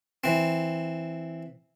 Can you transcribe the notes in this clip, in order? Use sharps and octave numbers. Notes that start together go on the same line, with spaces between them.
E3 C4